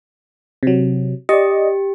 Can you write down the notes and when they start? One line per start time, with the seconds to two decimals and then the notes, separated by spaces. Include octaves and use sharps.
0.63 C3 F#3
1.29 G4 D5 D#5